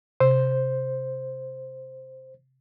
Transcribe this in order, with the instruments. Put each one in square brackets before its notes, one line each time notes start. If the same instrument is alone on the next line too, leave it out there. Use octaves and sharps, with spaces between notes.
[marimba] C3 [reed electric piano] C5